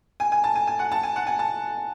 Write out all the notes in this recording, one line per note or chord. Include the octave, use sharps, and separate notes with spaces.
G#5
G#5
A5
G#5
G#5
F#5
A5
G#5
F#5
G#5
A5